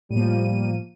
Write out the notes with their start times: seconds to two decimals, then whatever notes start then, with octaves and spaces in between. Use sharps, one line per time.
0.11 A2 F3 G3 A#3 D#7